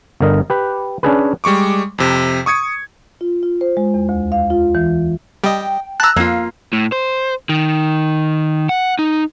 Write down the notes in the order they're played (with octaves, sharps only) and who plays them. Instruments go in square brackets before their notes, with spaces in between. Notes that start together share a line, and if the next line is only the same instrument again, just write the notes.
[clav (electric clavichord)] G1 D3 A#4 D#5
G4 B4
C#4 D4 G#4 B4
[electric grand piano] G3 G#3 C#6 D6
F2 C3
C#6 D#6 G#6 C#7
[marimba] F4
F4
C5
G#3
E2
D2
F5
F4
E3
[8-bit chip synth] G3 D#5 [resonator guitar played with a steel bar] G5
[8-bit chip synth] A5 A#5 [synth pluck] E6 F#6
[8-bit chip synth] F2 [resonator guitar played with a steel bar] A#3 F4
[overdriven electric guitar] A2
C5
D#3
F#5
D#4